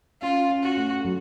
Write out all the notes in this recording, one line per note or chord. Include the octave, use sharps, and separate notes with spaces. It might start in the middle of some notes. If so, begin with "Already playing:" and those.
C#4 F4
C#4
F#4
A3
F#3